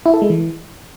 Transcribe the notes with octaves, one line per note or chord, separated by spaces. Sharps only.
E4
A4
G#3
E3